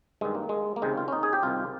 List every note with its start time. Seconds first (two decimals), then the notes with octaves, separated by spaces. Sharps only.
0.21 G2 D#3 G#3
0.35 A#3
0.49 G#3
0.76 A#3
0.82 C#2 C3 D#3 G#3
0.97 F4
1.08 C#4
1.12 D#4
1.23 G#4
1.33 G4
1.43 C2 C3 D#3 F4